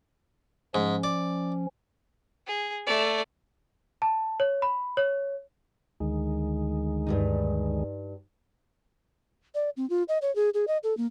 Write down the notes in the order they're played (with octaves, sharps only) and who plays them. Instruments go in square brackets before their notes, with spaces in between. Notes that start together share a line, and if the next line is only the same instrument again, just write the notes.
[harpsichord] G#2 [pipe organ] F3 C#4
[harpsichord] D5
[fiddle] G#4
A3 D5
[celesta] A5
C#5
B5
C#5
[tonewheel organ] D2 D#3 G#3
[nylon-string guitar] G2 G3 D#4
[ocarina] D5
C4
F4
D#5
C#5
G#4
G#4
D#5
A4
A#3